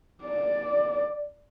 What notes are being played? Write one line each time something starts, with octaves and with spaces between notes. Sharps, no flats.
D5